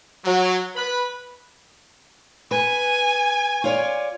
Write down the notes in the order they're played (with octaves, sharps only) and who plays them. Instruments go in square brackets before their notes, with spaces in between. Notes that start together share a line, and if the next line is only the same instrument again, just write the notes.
[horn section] F#3
B4 B5
[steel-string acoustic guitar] B4 [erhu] G#5
[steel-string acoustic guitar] F4 C#5 D5